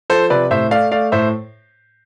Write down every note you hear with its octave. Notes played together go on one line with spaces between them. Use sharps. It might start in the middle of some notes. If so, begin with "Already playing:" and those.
F3 A4 C5
C3 B4 D5
A2 C5 E5
A3 D5 F5
A3 D5 F5
A2 C5 E5